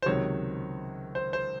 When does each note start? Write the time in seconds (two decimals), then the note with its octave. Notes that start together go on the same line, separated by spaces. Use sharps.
0.02 C5
0.06 C#2 C3 D#3 F#3 C#5
1.15 C5
1.33 C5